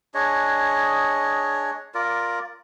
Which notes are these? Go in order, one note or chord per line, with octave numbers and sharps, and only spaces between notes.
D4 G#4 C#5 D#5
F4 A#4 D5